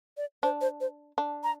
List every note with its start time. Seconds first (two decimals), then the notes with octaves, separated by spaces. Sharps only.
0.17 D5
0.43 D4 C5
0.61 C5
0.81 C5
1.18 D4
1.43 A#5